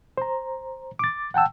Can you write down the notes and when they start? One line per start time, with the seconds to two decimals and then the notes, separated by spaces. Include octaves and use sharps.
0.17 C5 A#5
0.99 D6 A6
1.34 F#5 G5 A5 E6